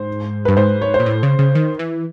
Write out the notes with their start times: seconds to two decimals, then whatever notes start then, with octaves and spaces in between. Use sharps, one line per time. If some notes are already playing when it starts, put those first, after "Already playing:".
Already playing: G#2 C5
0.45 G2 B4
0.57 G#2 C5
0.81 C#5
0.94 C5
1.00 A#2
1.06 A2
1.23 C#3
1.39 C#3
1.55 D#3
1.79 E3